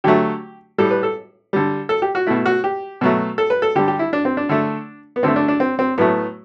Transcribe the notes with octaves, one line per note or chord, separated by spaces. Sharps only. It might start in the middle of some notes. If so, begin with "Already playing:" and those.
D3 F#3 A3 G4
A2 G3 A4
B4
A4
D3 G3
A4
G4
F#4
B2 A3 E4
F#4
G4
B2 F#3 A3
A4
B4
A4
D3 G3 G4
G4
E4
D4
C4
D4
D3 A3
B3
D3 A3 C4
D4
D4
C4
C4
A2 F#3 A3 B3